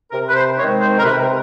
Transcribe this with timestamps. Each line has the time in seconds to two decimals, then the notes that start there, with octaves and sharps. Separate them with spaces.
0.12 C3 A#4
0.29 B4
0.35 C5
0.57 D#3 G#3 C4 D#4 C#5
0.80 C5
0.98 A#4
1.04 C3 B4